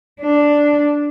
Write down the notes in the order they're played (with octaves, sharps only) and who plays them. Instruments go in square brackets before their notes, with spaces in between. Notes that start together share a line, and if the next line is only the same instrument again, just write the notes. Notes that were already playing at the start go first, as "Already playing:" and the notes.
[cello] D4